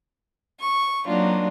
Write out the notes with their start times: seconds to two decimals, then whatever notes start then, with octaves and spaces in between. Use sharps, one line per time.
0.61 C#6
1.06 F#3 A#3 C4 D4 D#4 F4